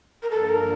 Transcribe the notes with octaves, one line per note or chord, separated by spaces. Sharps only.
A#4
G2 D3 F3 A#3 D4 A4
A#4